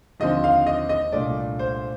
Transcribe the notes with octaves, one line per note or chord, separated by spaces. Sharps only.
D#2 D3 F3 C4 D#5
F5
D#5
D#5
C2 A#2 A3 D4 D5
C5